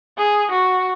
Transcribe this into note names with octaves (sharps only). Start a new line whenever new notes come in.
G#4
F#4